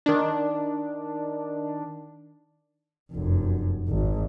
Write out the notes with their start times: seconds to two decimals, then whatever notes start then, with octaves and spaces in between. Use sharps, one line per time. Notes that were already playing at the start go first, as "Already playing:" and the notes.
0.06 D#3 D4
3.12 F1 F#2
3.89 G#1